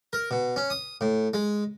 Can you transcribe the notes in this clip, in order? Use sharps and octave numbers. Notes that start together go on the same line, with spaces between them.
A#4
B2
C#4
D#6
A2
G#3